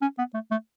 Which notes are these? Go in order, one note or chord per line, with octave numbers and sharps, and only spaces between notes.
C#4
B3
A3
A3